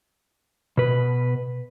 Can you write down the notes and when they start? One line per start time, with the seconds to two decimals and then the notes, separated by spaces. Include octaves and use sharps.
0.77 B2 B4